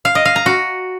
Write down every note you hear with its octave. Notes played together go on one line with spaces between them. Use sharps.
F5
D#5
F5
A#5
F#4